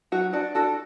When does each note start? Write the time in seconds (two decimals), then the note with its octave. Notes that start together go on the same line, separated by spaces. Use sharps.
0.12 F#3 F#4
0.33 D4 F#4
0.55 D4 F#4 A4